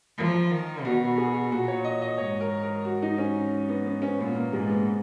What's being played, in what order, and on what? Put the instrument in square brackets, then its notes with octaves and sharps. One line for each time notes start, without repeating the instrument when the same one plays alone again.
[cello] F3 [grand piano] A#4
[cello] D#3
[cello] B2 [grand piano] F#4
[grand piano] G#4
[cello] A#2 [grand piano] F#4
[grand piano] C#5
D#5
D#5
[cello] G#2 [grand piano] C#5
[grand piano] A#4
A#4
F#4
D#4
C#4
B3
B3
C#4
[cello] A#2 [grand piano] B3
[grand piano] A#3
[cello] G#2 [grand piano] G#3
[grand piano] B3
B3